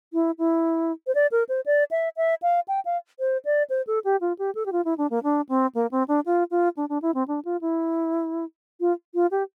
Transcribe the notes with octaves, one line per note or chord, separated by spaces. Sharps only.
E4
E4
C5
D5
A#4
C5
D5
E5
E5
F5
G5
F5
C5
D5
C5
A4
G4
F4
G4
A4
G4
F4
E4
D4
A#3
D4
C4
A#3
C4
D4
F4
F4
D4
D4
E4
C4
D4
F4
E4
F4
F4
G4